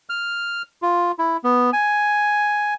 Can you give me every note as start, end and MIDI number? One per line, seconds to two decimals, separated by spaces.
0.10 0.62 89
0.82 1.12 65
1.19 1.37 64
1.44 1.70 59
1.73 2.74 80